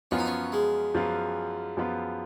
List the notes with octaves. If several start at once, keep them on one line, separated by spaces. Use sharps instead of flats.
F#2 F3 B3 C#4 F4
D#4
C#4
G#3
F#2 F3 B3 F4
F#2 F3 B3 F4